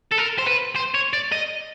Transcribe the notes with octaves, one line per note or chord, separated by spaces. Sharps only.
A4
A#4
C5
B4
C5
C#5
D5
D#5